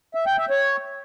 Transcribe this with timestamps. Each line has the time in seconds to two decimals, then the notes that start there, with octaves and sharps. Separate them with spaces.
0.14 E5
0.26 G5
0.38 E5
0.50 C#5